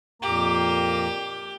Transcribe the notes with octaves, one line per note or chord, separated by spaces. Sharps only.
F2 A#2 A#3 G4 A#5